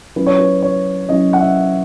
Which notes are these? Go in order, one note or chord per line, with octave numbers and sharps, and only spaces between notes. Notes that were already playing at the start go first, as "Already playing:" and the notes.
F#3 C#4 E4 B4
C#5
B4
C#5
F#3 C#4 E4 D#5
F#5
E5